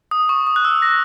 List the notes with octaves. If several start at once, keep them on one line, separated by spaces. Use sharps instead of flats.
D#6
C#6
D#6
F#6
E6
A#6